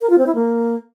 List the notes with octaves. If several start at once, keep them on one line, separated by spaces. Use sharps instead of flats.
A#4
F4
C4
E4
A#3